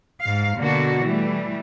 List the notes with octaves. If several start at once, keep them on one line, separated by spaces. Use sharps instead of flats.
G#2 F5
B2 D3 A#3 D4 F#4
E3 G3 A3